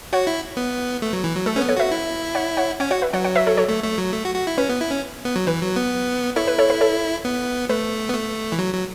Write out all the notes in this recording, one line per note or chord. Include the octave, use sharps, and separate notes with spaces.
F#4 C#5 F#5
E4
B3
A3
F#3
E3
F#3
A3 A4
B3 C#4 B4
A4 C#5
F#4 B4 E5
E4
C#5 F#5
C#5 F#5
C#4 C#5 F#5
F#4 C#5 F#5
B4 E5
F#3 C#5 F#5
C#5 F#5
B4 E5
A4 C#5
A4 C#5
A3
A3
F#3
A3
F#4
F#4
E4
C#4 B4
B3
E4
C#4
B3
F#3
E3 B4
F#3
B3
E4 A4 C#5
B4
A4 C#5
B4 E5
A4 C#5
B3
A3 B4
B3
A3
E3
F#3
F#3